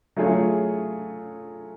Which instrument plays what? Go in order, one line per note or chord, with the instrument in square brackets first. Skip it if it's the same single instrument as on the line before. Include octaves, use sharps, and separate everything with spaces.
[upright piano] F#3 A3 F4 G#4 C#5